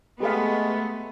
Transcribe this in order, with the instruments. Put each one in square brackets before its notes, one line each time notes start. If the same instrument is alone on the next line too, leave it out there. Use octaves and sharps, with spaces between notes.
[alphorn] G#3 [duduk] A3 [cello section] B3 [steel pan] G4 A4 F5